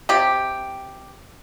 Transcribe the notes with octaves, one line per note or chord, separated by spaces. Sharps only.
C3 G4